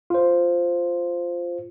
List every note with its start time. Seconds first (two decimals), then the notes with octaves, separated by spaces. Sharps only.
0.10 F4 C5